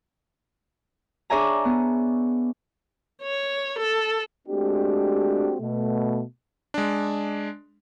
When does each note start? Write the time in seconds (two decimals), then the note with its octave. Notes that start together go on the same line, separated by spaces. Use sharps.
1.30 D4 G#4 C#5 E5 G#5 A#5
1.65 B3
3.22 C#5
3.79 A4
4.48 G#3 A3 C4 D4 F#4 G4
5.60 B2 A3
6.74 G#3 D4